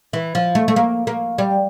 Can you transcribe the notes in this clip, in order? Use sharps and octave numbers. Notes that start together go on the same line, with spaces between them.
E3
F3
A3
A3
A#3
A#3
G3